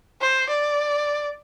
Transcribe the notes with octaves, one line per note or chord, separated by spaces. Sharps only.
C5
D5